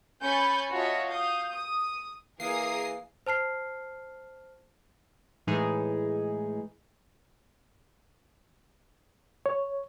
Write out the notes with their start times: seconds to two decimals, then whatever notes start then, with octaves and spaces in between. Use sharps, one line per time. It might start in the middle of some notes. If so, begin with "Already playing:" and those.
0.22 C#4 G#5 B5 C#6 G6 A6
0.72 F4 F#4 C#5 D#5 E5 A5
1.10 F5 D#6 G6
1.50 D#6
2.40 E3 A#3 G#4 A#4 C#5 D#6 C7
3.26 C5 A5 F6 C7
5.47 A2 E3 G#3 D#4 G#4
9.46 C#5